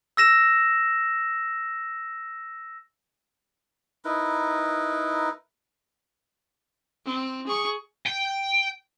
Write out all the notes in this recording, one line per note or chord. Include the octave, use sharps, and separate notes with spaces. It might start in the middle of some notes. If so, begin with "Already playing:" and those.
E6 A#6 E7
D#4 E4 A#4 B4
C4
G#4 C#6
G5